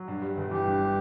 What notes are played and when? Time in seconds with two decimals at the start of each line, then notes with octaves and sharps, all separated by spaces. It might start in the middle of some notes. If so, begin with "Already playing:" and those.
Already playing: F#3
0.08 G2
0.22 G3
0.37 G1
0.51 E3 G4
0.65 G2
0.80 G3